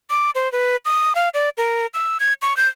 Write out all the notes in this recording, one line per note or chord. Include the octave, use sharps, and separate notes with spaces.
D6
C5
B4
D#6
F5
D5
A#4
E6
G#6
C#6
G6